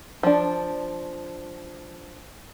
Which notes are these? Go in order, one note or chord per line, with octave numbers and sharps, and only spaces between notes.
F3 D4